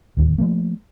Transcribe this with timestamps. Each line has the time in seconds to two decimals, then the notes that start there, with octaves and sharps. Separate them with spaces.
0.17 D1 D#2
0.38 F3 A3 A#3